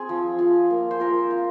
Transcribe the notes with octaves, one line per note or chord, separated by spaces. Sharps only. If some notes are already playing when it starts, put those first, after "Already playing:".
Already playing: C4 G#4
F3
F4
A#3
C5
F4 A#4
F4